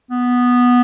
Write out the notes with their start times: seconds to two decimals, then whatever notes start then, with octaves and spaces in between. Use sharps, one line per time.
0.11 B3